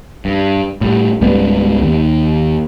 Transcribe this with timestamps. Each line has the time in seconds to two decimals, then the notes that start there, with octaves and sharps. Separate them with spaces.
0.25 G2
0.81 A2 G3
1.21 C#2 G#2 G3 B3
1.82 D#2